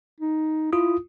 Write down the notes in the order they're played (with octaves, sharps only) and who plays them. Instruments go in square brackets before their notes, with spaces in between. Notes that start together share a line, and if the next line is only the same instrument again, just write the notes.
[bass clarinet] D#4
[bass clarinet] E4 [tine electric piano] F4 D#6